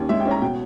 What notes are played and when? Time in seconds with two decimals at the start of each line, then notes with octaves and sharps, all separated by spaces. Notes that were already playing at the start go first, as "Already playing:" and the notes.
Already playing: D#2 C#4
0.09 G#3 E5
0.20 G5
0.25 C#4
0.31 A#5
0.42 B2 G5